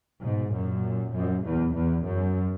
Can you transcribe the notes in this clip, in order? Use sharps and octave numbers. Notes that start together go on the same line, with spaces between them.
G#2 B2
F#2 A#2
F#2
E2
E2
F#2